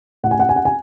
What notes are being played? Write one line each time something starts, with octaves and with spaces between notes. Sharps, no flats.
A2 F#5
G#5
F#5
G#5
F#5
G#5